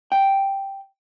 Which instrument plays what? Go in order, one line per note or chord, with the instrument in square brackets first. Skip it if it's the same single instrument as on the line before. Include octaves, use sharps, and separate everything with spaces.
[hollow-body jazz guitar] G5